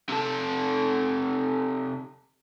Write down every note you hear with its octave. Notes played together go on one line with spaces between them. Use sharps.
C3 A4